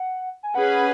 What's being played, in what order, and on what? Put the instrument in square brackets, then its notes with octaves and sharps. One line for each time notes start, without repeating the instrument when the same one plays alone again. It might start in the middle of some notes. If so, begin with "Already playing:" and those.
Already playing: [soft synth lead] F#5
G#5
[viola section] C#4 G#4 B4 [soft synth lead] F#5